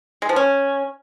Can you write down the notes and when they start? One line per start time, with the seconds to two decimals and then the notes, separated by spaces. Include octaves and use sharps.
0.22 G#3
0.29 F3
0.36 C#4